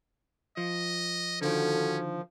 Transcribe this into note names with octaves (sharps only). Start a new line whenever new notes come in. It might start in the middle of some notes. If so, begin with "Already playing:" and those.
F3 D#5
D3 D#3 F3 C4 C#4 F#4 A4